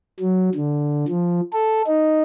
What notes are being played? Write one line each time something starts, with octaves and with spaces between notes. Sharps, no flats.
F#3
D3
F3
A4
D#4